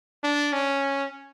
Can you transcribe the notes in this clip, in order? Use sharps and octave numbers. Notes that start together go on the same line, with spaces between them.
D4
C#4